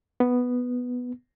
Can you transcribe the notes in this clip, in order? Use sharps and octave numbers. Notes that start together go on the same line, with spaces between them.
B3